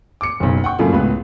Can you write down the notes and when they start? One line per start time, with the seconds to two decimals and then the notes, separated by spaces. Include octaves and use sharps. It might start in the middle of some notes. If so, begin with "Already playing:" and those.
0.21 D6 C#7
0.40 F#1 B1
0.64 F#5 G5 C#6
0.78 F#2 A2 C#3 A3 A#3 F4
0.92 C#2 A2 G#3 B3 B4